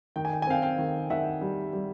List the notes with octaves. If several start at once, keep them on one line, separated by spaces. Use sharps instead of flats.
D#3 G5
G#5
G5
G#5
C4 F5 G5
F5 G5
D#3
D#3 E5 F#5
G3
G3